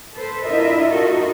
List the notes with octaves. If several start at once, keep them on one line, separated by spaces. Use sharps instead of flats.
A4 B4 C5
D4 E4 F4 A#4 D#5 E5
D#4 F4 F#4 A4 A#4 D#5